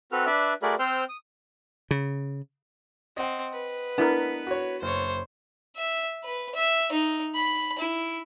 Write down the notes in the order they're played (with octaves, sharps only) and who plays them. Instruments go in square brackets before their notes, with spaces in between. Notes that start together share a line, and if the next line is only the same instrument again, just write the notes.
[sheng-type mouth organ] C4 F#4 A4 B4 F6
D4 B4 D5 E5
A3 F#4 G#4 A#4 D5 B5
C4 C5 G5 C6 E6 F6
D#6
[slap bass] C#3
[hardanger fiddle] C4 [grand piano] D#5 F#5
[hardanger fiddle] B4
[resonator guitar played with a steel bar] B3 [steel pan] D4 E4 A#4
[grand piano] F#4 C#5
[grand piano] F#1 [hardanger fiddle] C5 C#5
[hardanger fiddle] E5
B4
E5
D#4
B5
E4